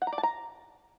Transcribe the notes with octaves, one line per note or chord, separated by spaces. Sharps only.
F#5
A#5
D5
A5
A#5